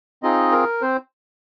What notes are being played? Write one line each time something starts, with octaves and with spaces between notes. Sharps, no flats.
C4 D#4 F4 G#4 D#5
A#4
C4 C5